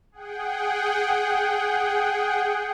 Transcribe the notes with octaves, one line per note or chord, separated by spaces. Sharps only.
G#4 F#5 G5